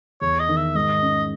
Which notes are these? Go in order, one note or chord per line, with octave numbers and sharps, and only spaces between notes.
E2 C#5
D#5
D#3
E5
G#2 D#5
C#4